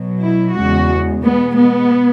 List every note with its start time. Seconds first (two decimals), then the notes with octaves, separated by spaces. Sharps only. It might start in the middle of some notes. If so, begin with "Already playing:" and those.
Already playing: B2 F#3
0.23 E4
0.57 E2 C#3 G#3 F#4
1.23 B2 G#3 B3
1.57 B3